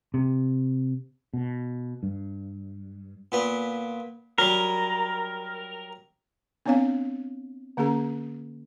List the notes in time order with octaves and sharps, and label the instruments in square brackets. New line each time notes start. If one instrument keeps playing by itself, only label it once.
[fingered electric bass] C3
[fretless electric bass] B2
G2
[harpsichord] A#2 B3
[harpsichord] F#3 G3 [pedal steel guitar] A#4
[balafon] B3 C4 D4 C#5 F5 G#5
D3 A#3 C#4 G#4 A#5